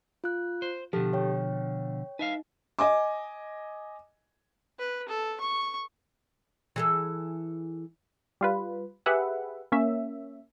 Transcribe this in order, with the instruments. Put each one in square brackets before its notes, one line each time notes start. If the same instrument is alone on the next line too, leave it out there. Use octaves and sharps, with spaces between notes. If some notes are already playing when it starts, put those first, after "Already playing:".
[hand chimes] F4 F#6
[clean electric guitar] C5
[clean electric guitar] B2 D3 F3 [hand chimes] G4 A4
[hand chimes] C#5 G5
[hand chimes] D#4 [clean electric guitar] B4 E5 F5
[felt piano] D#5 G#5 D6
[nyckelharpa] B4
A4
C#6
[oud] E3 G#4 A4
[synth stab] G3 F4 B4
G4 G#4 B4 E5 F#5
A#3 C#4 E5